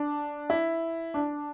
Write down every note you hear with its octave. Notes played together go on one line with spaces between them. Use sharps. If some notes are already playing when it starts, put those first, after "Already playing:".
Already playing: D4
E4
D4